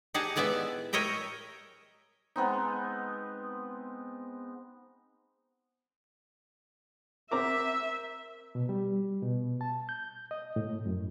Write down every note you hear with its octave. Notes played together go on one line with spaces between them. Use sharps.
D#4 G4 G#4 F#5 A5
A2 G#3 B3 D5 E5
A#4 C#5 D#5 E5 G5
G#3 B3 C4 D#4
C4 A#4 E5 A#5 D6
B2
G3
B2
A5
G6
D#5
A2
F#2